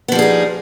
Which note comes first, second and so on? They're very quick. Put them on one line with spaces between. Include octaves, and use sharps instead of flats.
B3 F3 G3 G#4 D#4